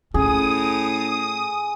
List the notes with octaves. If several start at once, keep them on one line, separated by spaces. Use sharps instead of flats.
A2 C#4 G#4 D#6